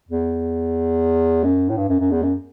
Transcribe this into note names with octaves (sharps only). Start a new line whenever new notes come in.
E2
F#2
A2
G2
F#2
F#2
E2
F#2